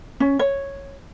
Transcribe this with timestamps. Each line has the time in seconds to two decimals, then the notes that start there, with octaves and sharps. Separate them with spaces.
0.20 C#4
0.39 C#5